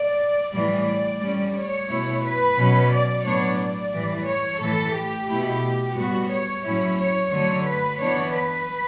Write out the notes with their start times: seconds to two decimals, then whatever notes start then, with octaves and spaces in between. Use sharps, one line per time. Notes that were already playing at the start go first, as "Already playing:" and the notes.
Already playing: D5
0.54 A2 E3 G3 D5
1.22 A2 G3 C#4
1.55 C#5
1.89 B2 A3 E4
2.24 B4
2.58 B2 F#3 C#4
2.91 D5
3.25 A2 F#3 B3 D4 C#5
3.58 D5
3.93 A2 E3 G3
4.27 C#5
4.60 A2 E3 A3 A4
4.94 G4
5.28 B2 A3 E4
5.96 A2 G3 B3 F#4
6.30 C#5
6.65 A2 F#3 C#4 E4
6.98 C#5
7.31 D3 F#3 A3 C#5
7.66 B4
8.00 E3 B3 D4 C#5
8.33 B4